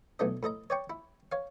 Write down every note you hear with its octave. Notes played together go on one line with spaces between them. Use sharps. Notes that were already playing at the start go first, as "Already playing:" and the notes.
B1 E3 A3 D4 D#5
A2 A4 D#5 A#5
C#5 D5 G5 C#6
E4
C#5 F5